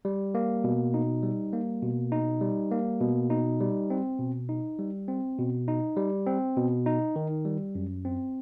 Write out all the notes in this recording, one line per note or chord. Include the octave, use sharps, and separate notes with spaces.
G3
A#3
B2
D#4
G3
A#3
B2
D#4
G3
A#3
B2
D#4
G3
C4
B2
D#4
G3
C4
B2
D#4
G3
C4
B2
D#4
D#3
G3
F#2
C4